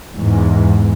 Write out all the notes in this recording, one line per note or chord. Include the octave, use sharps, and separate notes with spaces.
E2 G#2